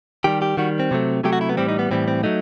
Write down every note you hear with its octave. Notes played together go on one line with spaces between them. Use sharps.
D#3 G3 G4
G4
D#3 G3 F#4
C4
C3 F#3 A3
C3 F#3 A3 G4
F#4
E4
B3
A2 E3 G3 C4
D#4
B3
A2 E3 G3 C4
C4
F#3 A3 D#4